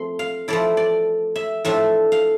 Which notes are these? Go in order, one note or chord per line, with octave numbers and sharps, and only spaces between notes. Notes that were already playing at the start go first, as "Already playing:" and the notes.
Already playing: F3 A3 C4 C6
F5
F3 A3 E4 D5
D5
E5
A2 F3 A3 D4 E5
F5